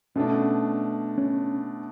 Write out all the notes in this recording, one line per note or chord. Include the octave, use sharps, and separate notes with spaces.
B2 A3 C#4 D4
C#4